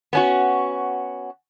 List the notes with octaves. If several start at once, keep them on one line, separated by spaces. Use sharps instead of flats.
B3 C#4 F#4